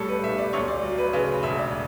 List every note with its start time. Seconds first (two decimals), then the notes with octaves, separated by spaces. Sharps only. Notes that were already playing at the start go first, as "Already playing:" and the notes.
Already playing: B1 A2 G3 A4 C#5 D5
0.09 B4
0.23 B1 E5
0.38 D5
0.53 D2 C#5
0.68 D5
0.83 F#3
0.98 B4
1.13 C#3 B4
1.43 E1 E5
1.58 D5